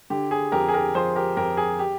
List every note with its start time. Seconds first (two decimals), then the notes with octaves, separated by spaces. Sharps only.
0.10 D3 G4
0.31 G#4
0.52 F2 G4 A#4
0.69 G#4
0.74 G4 A#4
0.94 F3 G#4 C5
1.16 G4 A#4
1.36 F2 G4 A#4
1.57 G#4
1.79 G4